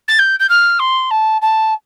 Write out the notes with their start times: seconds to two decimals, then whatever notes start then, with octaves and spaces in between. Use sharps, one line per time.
0.08 A6
0.19 G6
0.40 G6
0.49 F6
0.79 C6
1.11 A5
1.42 A5